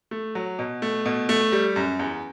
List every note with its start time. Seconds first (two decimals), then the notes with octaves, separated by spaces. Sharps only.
0.11 A3
0.35 F#3
0.59 B2
0.82 A3
1.06 B2
1.29 A3
1.52 G3
1.76 F#2
1.99 E2